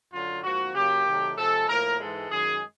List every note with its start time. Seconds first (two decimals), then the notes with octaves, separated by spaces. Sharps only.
0.11 F#2 D3 F#3 F4
0.43 G#2 F3 A#3 F#4
0.74 C#3 F#3 A#3 G4
1.05 C3 D#3 F#3 A3
1.37 C3 F3 G#3 A4
1.68 A2 F3 A#3 A#4
1.99 G#2 E3 G#3 A4
2.31 F#2 D#3 G#3 G#4